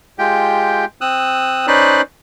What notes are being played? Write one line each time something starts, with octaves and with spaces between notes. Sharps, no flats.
G#3 F4 G4 G5
C4 D#6 E6 F#6
C#4 D#4 B4 C5 D5 F#6